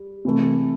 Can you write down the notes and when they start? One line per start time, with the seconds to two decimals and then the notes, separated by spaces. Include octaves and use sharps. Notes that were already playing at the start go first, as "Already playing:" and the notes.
Already playing: G3
0.25 C3 E3 A3